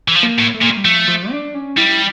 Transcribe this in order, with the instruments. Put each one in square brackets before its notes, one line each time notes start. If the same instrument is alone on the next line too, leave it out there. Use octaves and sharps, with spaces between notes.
[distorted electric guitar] E3
F3
[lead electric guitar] A#3
[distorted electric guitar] A2
[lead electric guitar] A3
[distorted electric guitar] A#2 [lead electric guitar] A#3
[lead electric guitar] A3
G3
[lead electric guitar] F3 [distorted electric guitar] A3
[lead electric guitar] F3
D4
C#4
[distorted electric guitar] G3 [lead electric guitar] E4